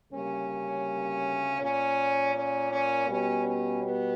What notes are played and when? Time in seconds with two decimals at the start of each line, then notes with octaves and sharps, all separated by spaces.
0.12 D2 C#3 G3 A#3 C#4
1.60 A#2 A#3 C#4
2.34 C#4
2.71 C#4
3.08 B2 G3 B3 C#4
3.45 C#4
3.82 B3